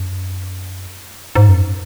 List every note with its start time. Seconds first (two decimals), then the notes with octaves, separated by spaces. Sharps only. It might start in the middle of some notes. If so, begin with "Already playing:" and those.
Already playing: F#2
1.35 G#2
1.49 F#2